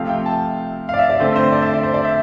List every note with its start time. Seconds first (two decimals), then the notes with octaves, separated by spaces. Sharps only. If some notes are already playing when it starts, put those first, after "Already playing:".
Already playing: C3 F3 A3 C4 F5
0.09 G5
0.26 A5
0.89 F5
0.94 D5
0.99 E5
1.10 D5
1.20 D3 A3 C4 C5
1.36 C5
1.52 D5
1.62 E5
1.73 D5
1.83 C5
1.94 D5
2.05 E5